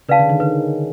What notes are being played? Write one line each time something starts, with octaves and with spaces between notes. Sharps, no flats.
C#3 B4 D5 F5 A5
D3
D#3
D#3 B4